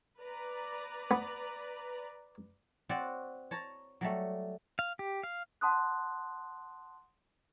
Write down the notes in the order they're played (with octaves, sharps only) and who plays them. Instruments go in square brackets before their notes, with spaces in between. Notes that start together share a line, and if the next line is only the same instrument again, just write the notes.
[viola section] B4 D5 A#5
[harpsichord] B3
[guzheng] C4 F#4 C#5 D5 F#5
C#5 A5 A#5
F#3 G3 A3
[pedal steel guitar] F5
G4
F5
[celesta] F#5 A5 C6 D#6 F#6